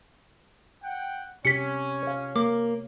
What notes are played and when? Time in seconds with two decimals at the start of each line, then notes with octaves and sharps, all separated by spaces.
0.83 F#5 G5
1.45 C3 C#4 G4 B6 C#7
2.03 C#5 F5
2.36 A#3 D6